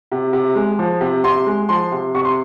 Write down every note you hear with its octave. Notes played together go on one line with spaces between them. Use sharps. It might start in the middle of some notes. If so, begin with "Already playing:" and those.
C3
C3
G#3
F3
C3
C3 C6
G#3
F3 C6
C3
C3 C#6
C6